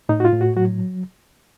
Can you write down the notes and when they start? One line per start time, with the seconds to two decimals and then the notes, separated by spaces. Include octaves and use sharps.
0.09 A2 D#4
0.20 F#4
0.25 F4
0.33 A2
0.41 F#4
0.56 F#3 F#4